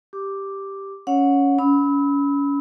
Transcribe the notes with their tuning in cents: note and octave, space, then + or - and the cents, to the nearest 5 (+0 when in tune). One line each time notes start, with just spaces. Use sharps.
G4 +0 D6 +0
C#4 +5 C#5 +0 F#5 -25
C#4 +30 B5 +0 E6 -35